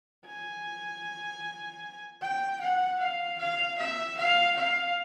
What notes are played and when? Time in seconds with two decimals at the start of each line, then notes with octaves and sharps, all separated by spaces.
0.26 G#5
2.21 G5
2.61 F#5
2.99 F5
3.39 F5
3.78 E5
4.18 F5
4.56 F5